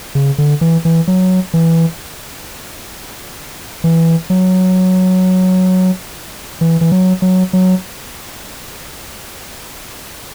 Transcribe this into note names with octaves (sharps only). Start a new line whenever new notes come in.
C#3
D3
E3
E3
F#3
E3
E3
F#3
E3
E3
F#3
F#3
F#3